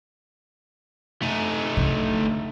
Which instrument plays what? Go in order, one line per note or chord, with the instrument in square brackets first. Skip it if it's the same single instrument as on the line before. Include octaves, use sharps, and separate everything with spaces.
[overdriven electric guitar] A3 D#4
[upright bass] D3